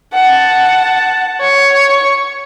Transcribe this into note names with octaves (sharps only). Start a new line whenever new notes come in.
F#5 A5
C#5 C#6